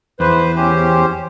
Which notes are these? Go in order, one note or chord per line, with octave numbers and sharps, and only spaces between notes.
E2 B4 C5
C#4 G4 C5